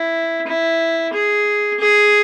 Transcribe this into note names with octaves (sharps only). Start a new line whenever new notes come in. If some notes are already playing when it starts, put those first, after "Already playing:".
Already playing: E4
E4
G#4
G#4